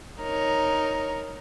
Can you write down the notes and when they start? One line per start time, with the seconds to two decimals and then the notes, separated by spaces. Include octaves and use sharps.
0.20 D#4 A#4 C#5